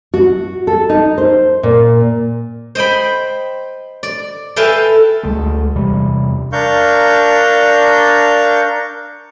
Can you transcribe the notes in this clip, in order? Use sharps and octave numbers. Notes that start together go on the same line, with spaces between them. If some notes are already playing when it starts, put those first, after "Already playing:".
F#4
A4
D#4
C5
A#2
C5 D#5 G5 B5
D5
A4 B4 E5 F5 G5 G#5
D2 D3 G#3 A3
E2 C3 G3
D4 A#4 F5 C#6 G6